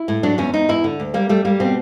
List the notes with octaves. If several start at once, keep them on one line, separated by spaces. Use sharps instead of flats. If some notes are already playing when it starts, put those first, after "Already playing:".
Already playing: E4
A2
F#3 D4
E2 C#4
E2 D#4
E2 E4
D3
D2
G3 A#3
G3 A3
G3 A#3
B2 C4